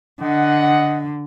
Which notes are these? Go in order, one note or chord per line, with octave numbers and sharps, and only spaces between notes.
D3 D#5 F#5